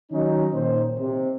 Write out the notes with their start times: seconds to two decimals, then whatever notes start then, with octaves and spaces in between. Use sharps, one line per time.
0.12 D#3 F#3 C#4 D#4
0.55 A#2 D#3 C5
0.98 C3